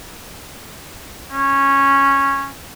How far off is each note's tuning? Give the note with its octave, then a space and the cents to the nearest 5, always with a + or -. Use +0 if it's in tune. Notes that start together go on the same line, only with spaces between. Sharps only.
C#4 -10